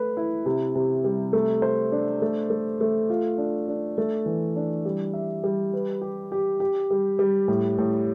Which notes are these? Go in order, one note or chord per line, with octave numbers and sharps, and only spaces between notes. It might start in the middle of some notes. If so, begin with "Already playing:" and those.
Already playing: A3 B4
E4
C3
C3
G3
A3
C5
D4
A3
A3
A3
F4
D4
D4
A3
E3
D4
G3
E5
G3
B4
G4
G4
G4
G3
G3
A2
A2